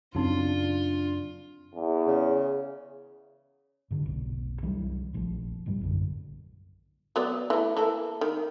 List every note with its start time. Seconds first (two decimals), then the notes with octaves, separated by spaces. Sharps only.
0.15 F#2 C#3 C4 D4 D#4 F4
1.75 E2
2.07 C#3
3.91 G#2 D3
4.03 F1 B1
4.62 C2 E3 F#3 G3
5.13 F1 A#1 F2 F3
5.66 D1 G#2 G3
5.81 A#1 F#2 D3
7.16 F#3 B3 D5
7.50 E3 A3
7.77 E3 A#3 A4
8.21 D#3